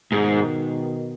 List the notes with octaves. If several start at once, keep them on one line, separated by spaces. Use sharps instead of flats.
G#2 B2 D#3